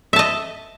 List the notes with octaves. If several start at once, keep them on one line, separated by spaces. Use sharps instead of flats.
D#5 E5 A5